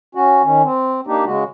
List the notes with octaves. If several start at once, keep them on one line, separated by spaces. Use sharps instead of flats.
C#4 F#4
D#3 C#4
C4
A#3 D4 D#4 G4
C#3 G#3 F#4